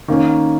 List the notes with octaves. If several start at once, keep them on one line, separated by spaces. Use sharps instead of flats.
D#3 A#3 C#4